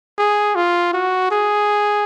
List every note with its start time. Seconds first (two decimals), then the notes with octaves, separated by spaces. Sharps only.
0.18 G#4
0.55 F4
0.93 F#4
1.31 G#4